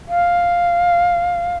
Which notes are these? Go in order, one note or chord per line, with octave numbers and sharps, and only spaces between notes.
F5